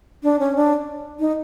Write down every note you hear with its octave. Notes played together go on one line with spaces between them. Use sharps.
D4
C#4
D4
D#4